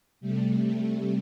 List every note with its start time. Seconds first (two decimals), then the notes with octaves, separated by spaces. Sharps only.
0.21 C3 G3 A3